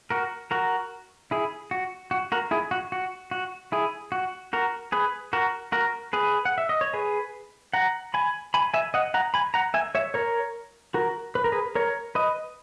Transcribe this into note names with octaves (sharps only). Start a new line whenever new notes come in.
F#4 A#4
F#4 A#4
E4 G#4
F#4
F#4
F#4 A#4
E4 G#4
F#4
F#4
F#4
E4 G#4
F#4
F#4 A#4
G#4 B4
F#4 A#4
F#4 A#4
G#4 B4
F#5
E5
D#5
C#5
G#4 B4
F#5 A#5
G#5 B5
G#5 B5
E5 G#5
D#5 F#5
F#5 A#5
G#5 B5
F#5 A#5
E5 G#5
C#5 E5
A#4 C#5
F#4 A#4
B4
A#4
G#4 B4
A#4 C#5
B4 D#5